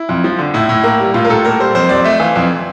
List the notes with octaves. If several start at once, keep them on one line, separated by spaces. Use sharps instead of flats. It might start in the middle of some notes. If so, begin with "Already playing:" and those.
Already playing: E4
F2
F3
D3
A2 E4
A2
A#3
G3
A2 F4
A#4
A2 A4
A#3 A#4
G3 C5
F2 C5
F2 D5
A3 E5
E3 F5
F2